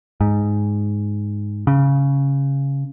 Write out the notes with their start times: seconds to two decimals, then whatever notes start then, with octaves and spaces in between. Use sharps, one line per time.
0.21 G#2
1.67 C#3